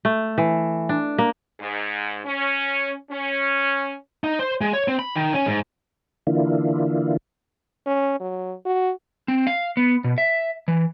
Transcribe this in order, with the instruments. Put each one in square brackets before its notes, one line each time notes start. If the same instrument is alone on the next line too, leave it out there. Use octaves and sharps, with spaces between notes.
[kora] A3
E3
D4
A#3
[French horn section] G#2
C#4
C#4
[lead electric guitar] D#4
C5
G#3
C#5
C4
B5
D#3
C#4
G#2
[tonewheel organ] D3 E3 A#3 D4 E4 F4
[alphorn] C#4
F#3
F#4
[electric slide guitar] C4
F5
B3
B2
E5
E3